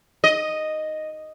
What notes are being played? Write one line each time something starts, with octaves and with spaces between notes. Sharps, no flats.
D#5